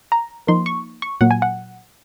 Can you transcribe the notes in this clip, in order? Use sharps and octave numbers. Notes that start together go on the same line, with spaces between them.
A#5
F3 A#3 D#4 C6
C#6
C#6
A#2 F#3 A#3 F#5
G#5
F#5